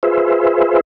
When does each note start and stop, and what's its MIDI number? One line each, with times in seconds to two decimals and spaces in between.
0.03 0.81 65
0.03 0.81 68
0.03 0.81 71
0.03 0.81 72
0.03 0.81 76